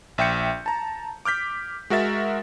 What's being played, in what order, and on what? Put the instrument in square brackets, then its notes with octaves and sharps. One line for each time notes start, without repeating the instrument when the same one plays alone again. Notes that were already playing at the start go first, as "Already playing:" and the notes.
[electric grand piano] A#1 E5 G5 G6 C#7
A5 A#5
D6 F6 G6 B6
G#3 F#4 A#4 E5 A6